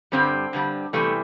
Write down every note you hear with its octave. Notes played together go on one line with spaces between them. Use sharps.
G2 D3 G3 C4
G2 D3 G3
E2 C3 E3 G3 A3